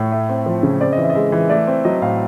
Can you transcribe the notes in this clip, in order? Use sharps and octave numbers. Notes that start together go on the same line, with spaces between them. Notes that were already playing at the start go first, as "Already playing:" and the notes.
Already playing: A2 C#5
A3
C4
F3
C#3
C4 D5
D#5
E3
E5
D#5
G#3 E5
E3
A3 D5
C4
F#3 D#5
A2 F5